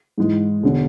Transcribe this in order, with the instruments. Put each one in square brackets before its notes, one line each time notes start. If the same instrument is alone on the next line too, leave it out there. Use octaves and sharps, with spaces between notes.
[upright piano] G#2 E3 G#3
E1 D3